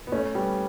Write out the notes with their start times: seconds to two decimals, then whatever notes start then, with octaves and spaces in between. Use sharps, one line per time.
0.07 B3
0.12 A3 C#4
0.35 G3 B3